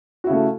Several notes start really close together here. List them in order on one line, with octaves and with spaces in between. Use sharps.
F#4 E4 C#3 A3